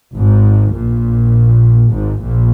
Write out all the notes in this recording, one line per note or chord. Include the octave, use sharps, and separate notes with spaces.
G#1 G#2
A#1 A#2
G#1 G#2
A#1 A#2